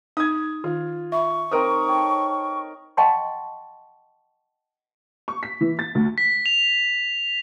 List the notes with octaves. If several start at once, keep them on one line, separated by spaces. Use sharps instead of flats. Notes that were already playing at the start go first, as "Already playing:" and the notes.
D#4 D#6 G#6
D#3 F4
E5 B5 C#6
C4 D#4 A#4 C5 D#5 D#6
A4 C#5 G5
D#5 F#5 G5 A5 C6 C#6
C#6
B6
E3
A6
D2
B6
F7